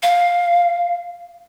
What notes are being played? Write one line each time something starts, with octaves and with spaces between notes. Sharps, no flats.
F5